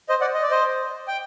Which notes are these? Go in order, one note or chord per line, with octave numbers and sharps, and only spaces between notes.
C5 D#5
D5 F#5
D#5
D5
C5 D#5
G5